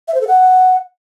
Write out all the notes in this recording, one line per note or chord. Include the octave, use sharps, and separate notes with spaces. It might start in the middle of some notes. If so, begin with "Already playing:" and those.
E5
C5
A4
F#5